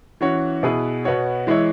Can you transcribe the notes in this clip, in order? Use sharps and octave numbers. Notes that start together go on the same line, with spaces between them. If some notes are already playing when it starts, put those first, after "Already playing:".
E3 C#4 F#4 C#5
B2 B3 E4 G#4 B4
B2 B3 F#4 C#5
E3 G#3 E4 C#5